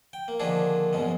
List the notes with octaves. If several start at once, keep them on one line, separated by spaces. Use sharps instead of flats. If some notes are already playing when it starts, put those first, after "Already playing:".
G5
A#3
D3 D#3 F3 A#3 D4 G#4
A#1 F#2 B2 G#3